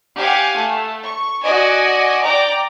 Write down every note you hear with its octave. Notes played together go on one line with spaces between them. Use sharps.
G4 F5 F#5 G#5
A3
C#6
F#4 D5 D#5 G#5
D5 G5 A#5 D6